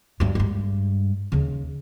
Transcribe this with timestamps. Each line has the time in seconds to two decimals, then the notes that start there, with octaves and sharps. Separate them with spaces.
0.20 G2 F#3
0.35 G2 G#3
1.32 D#2 C#3